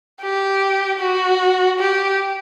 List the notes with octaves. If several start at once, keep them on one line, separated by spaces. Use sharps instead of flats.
G4
F#4
G4